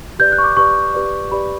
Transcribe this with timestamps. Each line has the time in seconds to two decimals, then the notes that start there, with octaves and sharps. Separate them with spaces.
0.19 G4 B4 D5 G6
0.32 F#6
0.38 C#6
0.44 D6
0.57 G4 B4 D5 C#6
0.94 G4 B4 D5
1.31 G4 B4 D5 B5